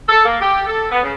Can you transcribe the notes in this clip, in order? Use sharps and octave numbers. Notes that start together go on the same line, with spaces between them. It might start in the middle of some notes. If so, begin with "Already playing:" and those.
A4
A#3
G4
A4
B3
C#3